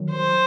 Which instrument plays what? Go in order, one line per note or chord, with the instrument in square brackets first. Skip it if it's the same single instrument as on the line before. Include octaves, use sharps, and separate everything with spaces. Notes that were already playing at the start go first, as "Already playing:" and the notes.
Already playing: [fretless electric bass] D#3 F#3
[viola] C5